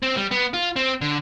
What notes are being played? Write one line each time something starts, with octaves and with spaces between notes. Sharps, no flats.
C4
G3
B3
F4
C4
D3